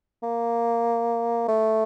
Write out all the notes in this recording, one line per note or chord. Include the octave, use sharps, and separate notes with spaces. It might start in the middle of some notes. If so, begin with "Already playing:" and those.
A#3
A3